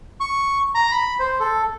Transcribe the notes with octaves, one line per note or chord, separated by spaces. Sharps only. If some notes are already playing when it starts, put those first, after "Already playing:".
C#6
A#5
B5
C5
A4